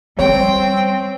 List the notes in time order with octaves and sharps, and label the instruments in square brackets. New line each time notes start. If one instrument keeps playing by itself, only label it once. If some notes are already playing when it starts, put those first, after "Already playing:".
[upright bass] G3 [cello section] C4 [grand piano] C#5 [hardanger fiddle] G5